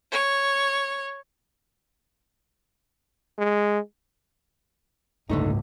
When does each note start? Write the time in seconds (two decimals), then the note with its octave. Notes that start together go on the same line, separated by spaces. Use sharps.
0.12 C#5
3.38 G#3
5.30 F#1 C#2 G#2 D3 A3 D#4